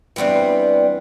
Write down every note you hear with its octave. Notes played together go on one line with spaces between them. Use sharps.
E3 G3 B3 C4 D4